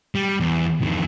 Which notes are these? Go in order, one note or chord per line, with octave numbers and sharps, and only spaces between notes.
G3
E2
F2 D#3